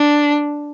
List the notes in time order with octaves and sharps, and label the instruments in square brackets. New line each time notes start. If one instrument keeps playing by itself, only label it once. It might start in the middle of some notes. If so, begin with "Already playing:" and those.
Already playing: [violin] D4